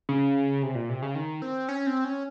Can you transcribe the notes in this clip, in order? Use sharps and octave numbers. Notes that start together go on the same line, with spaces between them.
C#3
C3
A#2
C3
C#3
D#3
C4
C#4
C4
C#4